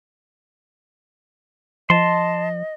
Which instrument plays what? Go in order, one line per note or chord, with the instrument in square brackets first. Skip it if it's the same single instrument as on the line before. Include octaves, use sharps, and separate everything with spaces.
[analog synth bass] F3 [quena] D#5 [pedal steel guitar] A5 C6